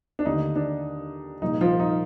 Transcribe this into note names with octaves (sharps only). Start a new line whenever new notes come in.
D4
D#2 D3 A3 D#4
D4
C2 A#2 F3 D#4
F3 F4
D#4